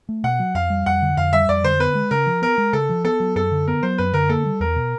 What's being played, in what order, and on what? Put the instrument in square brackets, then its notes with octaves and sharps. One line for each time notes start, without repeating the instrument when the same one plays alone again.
[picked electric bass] A3
[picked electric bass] B2 [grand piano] F#5
[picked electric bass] F#3
[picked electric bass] F2 [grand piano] F5
[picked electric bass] G3
[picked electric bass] F2 [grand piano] F#5
[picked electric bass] D3
[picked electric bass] F2 [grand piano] F5
[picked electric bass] G3 [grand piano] E5
[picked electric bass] F2 [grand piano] D5
[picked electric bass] D3 [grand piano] C5
[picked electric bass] B3 [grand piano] B4
[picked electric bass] G#3
[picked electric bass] C#3 [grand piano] A#4
[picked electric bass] F3
[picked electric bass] B3 [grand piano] A#4
[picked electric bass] G#3
[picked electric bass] C#3 [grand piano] A4
[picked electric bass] F3
[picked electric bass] B3 [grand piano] A4
[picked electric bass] F#3
[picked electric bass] F#2 [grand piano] A4
[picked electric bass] D3
[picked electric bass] B3 [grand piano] A#4
[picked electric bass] F#3 [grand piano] C5
[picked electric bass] F#2 [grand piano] B4
[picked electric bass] D3 [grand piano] A#4
[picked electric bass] A#3 [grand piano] A4
[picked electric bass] G3
[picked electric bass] E2 [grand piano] A#4
[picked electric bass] B2